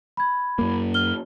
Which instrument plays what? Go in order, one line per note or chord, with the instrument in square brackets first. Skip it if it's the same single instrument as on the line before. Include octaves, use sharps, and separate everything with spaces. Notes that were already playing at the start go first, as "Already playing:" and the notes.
[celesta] B5 G#6
[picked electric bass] F#2 A#3
[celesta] F6 G7